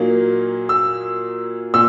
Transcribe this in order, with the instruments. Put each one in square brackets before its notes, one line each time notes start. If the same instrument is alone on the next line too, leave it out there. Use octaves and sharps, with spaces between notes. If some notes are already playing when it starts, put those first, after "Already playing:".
Already playing: [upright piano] A#2 F#3 A#3 D#4
E6
A#2 E6